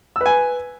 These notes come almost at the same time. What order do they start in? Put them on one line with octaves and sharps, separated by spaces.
E6 B4 G#5